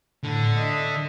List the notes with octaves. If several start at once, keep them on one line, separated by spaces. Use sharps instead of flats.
A2 D3
D#5 E5